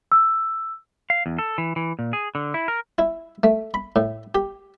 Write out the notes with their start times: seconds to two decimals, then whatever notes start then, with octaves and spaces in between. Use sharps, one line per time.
0.12 E6
1.10 F5
1.26 E2
1.39 A4
1.58 E3
1.76 E3
1.99 A#2
2.13 G#4
2.35 D3
2.54 E4
2.68 A#4
2.99 E4
3.43 A3
3.74 B5
3.96 A2
4.35 G4